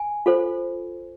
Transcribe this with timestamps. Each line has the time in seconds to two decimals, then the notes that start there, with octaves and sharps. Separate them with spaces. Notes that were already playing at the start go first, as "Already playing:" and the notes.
Already playing: G#5
0.26 F4 A4 C5